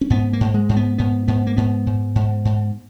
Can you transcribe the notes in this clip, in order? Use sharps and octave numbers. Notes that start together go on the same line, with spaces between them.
C#4
G#2 B3
A#3
G#2
G#3
G#2
B3
G#2 B3
G#2 B3
A#3
G#2 B3
G#2
G#2
G#2